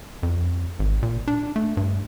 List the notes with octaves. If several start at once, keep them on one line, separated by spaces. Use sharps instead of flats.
F2
G#1
A#2
D4
A3
G2